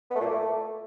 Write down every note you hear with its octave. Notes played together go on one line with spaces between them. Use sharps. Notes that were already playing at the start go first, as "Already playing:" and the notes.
B3
A3
A#2
A#3
A3